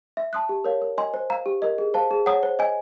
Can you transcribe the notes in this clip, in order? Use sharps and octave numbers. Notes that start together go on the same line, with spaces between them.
E5
A5 C6 D#6 F#6
G4
A#4 C#5 F5
A#4
D#5 G#5 C6
C5
F5 A#5
G4
A#4 D#5
G#4
C5 F5 A5
G#4
C#5 F#5 A#5 D#6
C5
D#5 G#5